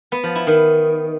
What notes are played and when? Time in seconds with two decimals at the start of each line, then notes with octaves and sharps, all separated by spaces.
0.12 B3
0.24 F3
0.35 E4
0.47 D#3